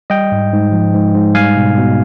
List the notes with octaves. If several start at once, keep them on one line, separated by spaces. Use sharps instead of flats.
G3 D#5 G5
G#2
G#2
F3
G#2
G#2
G3 F5 G#5
B2
B2